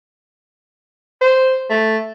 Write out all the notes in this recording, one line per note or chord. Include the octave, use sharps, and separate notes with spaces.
C5
A3